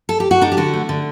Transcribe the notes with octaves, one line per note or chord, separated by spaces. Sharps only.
A4
G4
F#4
D4 D#4
G4
D3 F#4
A3
D3